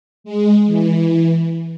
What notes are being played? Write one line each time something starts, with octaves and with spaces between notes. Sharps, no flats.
G#3
E3